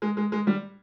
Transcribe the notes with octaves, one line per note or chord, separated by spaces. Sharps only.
G#3
G#3
G#3
G3